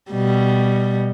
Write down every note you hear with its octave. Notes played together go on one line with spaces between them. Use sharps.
B2 G3